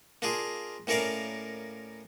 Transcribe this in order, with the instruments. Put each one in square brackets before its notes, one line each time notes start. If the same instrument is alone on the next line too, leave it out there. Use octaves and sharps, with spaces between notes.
[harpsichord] A#3 D4 F4 G#4
A2 A#3 C#4 A#4 D5 F5